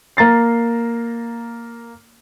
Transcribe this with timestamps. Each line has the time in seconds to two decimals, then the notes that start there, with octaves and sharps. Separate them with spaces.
0.17 A#3 A#5 A6 C7